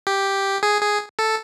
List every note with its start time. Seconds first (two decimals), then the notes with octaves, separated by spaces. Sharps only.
0.07 G4
0.63 G#4
0.81 G#4
1.19 A4